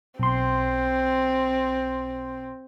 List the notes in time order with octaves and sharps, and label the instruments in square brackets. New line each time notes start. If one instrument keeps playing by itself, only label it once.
[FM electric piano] B1 C6 [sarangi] C4